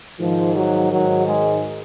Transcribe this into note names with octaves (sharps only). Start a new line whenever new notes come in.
G#2 D#3 F3
F#3
G#2 D#3 F#3
G#3